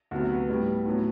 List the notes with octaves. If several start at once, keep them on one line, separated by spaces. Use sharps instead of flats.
D2 C3 F#3 B3 F#4
B4
A2 G3 B3
A2 F#3 B3